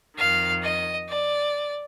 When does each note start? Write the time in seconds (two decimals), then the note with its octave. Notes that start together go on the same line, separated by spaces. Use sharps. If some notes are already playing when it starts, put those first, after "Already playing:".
0.16 F2 D#3 F5
0.62 D#5
1.07 D5